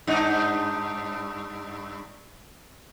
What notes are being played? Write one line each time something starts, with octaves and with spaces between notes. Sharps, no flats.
G2 D4 D#4